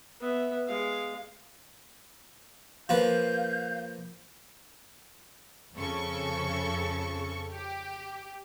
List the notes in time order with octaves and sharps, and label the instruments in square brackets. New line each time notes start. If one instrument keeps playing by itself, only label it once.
[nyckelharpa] B3 E5
G#3 F5
[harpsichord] F3 A#3 B4 [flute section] F5 G6
[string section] F2 C#3 A4 C#6
G4